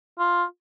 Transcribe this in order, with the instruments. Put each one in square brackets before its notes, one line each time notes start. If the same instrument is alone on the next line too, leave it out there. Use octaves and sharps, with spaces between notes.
[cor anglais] F4